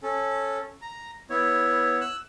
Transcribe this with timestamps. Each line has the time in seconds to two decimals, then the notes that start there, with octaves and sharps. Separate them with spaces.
0.03 C#4 A4
0.82 A#5
1.30 B3 E4 C#5
2.01 E6 F#6